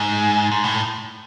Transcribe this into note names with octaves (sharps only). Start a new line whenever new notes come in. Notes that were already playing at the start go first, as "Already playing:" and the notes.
Already playing: G#2
G#2
A2